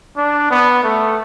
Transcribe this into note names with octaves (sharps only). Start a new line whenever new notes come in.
D4
B3
A3